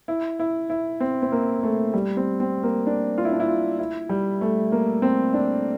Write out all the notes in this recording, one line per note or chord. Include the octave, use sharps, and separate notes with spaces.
E4
E4
E4
C4
C4
A#3
A3
G3
C4
C4
A#3
D4
F4
E4
D4
E4
F4
E4
G3
A3
A#3
C4
D4